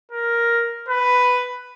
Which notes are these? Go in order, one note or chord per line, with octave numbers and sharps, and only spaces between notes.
A#4
B4